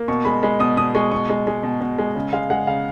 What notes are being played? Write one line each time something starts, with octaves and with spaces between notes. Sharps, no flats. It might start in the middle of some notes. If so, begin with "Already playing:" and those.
Already playing: A#3
B2 C#6
G#3 B5
G#3 B5
B2 D#6
B2 D#6
G#3 C#6
B2 C#6
G#3
G#3
B2
B2
G#3
C#3
G#3 F5
G#3 F#5
C#3 F5